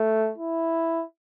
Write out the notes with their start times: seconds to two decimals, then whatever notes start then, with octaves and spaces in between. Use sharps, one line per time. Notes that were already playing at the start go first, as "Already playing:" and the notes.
Already playing: A3
0.38 E4